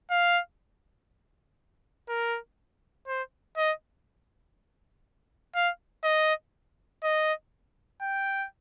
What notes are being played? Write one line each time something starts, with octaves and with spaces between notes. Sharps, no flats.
F5
A#4
C5
D#5
F5
D#5
D#5
G5